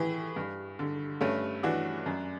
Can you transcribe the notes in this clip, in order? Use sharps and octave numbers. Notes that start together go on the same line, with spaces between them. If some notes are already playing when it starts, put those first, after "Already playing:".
Already playing: A2 E3
G2
D3
G2 A3 C#4
E3 D4 F#4
F#2